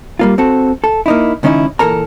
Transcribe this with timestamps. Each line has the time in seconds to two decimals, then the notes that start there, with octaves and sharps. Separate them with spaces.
0.19 G3 A#3 F4
0.38 C4 F#4 A4
0.84 A4
1.06 A#3 D#4 E4
1.43 C#2 D#3 C#4 D#4 E4
1.79 A#2 E3 A4 A#4 A#5